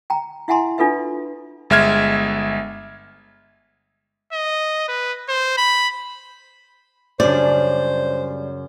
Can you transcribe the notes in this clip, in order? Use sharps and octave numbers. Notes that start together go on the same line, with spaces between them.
G5 A#5
E4 E5 F#5 G#5 A#5 C6
D4 F4 A4 B4 E5
G1 G#3 E5 F6 G#6
D#5
B4
C5
B5
F#2 C#3 G3 D4 C5 D5